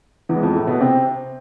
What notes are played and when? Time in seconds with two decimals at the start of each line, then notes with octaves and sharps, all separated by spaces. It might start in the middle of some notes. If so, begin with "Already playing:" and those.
0.29 E2 E3
0.36 G#3
0.42 F2 F3
0.55 A2 A3
0.67 B2 B3
0.81 C3 C4